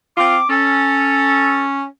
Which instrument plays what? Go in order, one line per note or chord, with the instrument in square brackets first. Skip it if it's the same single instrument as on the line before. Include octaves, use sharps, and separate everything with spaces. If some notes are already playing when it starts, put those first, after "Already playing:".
[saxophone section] C4 F4 [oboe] D6
[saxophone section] C#4 [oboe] A4